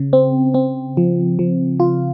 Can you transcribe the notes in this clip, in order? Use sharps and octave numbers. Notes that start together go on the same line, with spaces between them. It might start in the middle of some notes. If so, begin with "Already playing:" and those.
Already playing: C#3
C4
C4
F3
F3
F4